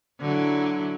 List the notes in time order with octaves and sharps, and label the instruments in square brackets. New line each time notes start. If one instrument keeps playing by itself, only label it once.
[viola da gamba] D3 F#3 E4